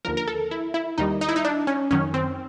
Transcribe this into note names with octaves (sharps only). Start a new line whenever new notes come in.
D#2 D3 F3 A#4
A#4
A4
E4
E4
D#2 D#3 G3 D#4
D#4
E4
D#4
D4
C#4
F#2 D#3 F#3 C#4
C4